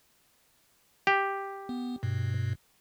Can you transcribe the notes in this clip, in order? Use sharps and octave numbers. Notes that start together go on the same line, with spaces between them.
G4
B3
G2 B2